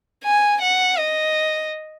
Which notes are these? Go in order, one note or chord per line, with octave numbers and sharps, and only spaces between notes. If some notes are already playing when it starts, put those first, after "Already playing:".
G#5
F#5
D#5